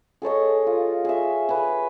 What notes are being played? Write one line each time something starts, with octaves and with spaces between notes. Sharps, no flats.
G#4 A4 C#5 D#5
F4
G#4 E5
G#4 B4